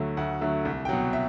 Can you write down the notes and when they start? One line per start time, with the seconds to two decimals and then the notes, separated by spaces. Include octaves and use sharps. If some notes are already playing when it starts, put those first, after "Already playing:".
Already playing: D2 D3 F#3 A3
0.17 D2 F#5
0.41 D3 F#3 A3 E5
0.65 C2
0.85 G5
0.89 B2 F#3 F#5
1.13 E5